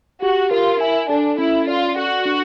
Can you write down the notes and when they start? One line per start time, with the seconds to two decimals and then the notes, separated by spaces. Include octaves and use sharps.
0.22 F#4 G4
0.51 F4 A#4
0.80 E4 G#5
1.09 D4 A4
1.38 C#4 E4
1.67 F4 D5
1.96 F#4 A4
2.25 D4